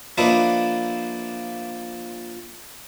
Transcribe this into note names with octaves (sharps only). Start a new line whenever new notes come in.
F3 A#3 D4 B4 D#5 E5